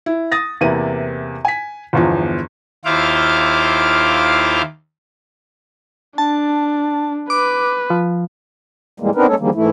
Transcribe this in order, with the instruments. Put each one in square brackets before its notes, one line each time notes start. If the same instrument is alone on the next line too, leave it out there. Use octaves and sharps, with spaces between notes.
[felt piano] E4
D#6 A6 A#6
E2 C3 A#3 E4 B4 D#7
G#5 B6
G1 E2 F3
[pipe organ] D#2 E4 F4 C5 F5 D6
[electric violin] D4 [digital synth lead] A5
[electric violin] B4 [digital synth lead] D6
[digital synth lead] F3
[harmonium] F2 A#2 E3 G3 G#3 A#3
B3 C4 D4 D#4 A#4 B4
G#3 A#3 C#4 A4 C#5
D3 D#3 F3 G3 G#3 A#3
G#2 E3 A3 E4